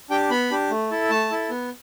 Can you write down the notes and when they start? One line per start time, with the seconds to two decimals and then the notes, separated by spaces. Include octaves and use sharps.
0.10 D4 G4 G5
0.30 B3 B5
0.51 D4 G4
0.70 A3
0.91 E4 A4
1.10 A3 A5
1.30 E4 A4
1.50 B3